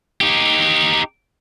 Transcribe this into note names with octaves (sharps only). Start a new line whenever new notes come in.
D#4 G4